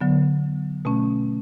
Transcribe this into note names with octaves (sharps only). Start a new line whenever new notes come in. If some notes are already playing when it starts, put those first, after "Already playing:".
D3 F#3 B3
B2 A3 C#4